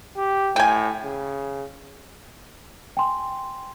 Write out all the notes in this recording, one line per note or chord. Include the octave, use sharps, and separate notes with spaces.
G4
A2 G5 G#5
C#3
G5 G#5 C6